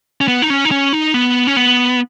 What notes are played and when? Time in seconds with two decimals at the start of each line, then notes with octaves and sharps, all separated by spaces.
0.21 C#4
0.28 B3
0.42 D#4
0.50 C#4
0.65 D#4
0.71 C#4
0.93 D#4
1.14 B3
1.47 C#4
1.57 B3